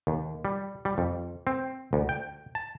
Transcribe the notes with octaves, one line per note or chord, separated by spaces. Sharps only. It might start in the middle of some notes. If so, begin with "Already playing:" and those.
D#2
G3
G3
F2
C4
D2
G5
A5